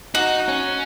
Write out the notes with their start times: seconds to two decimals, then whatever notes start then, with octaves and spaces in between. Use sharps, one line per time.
0.15 D#4 F#4
0.48 C#4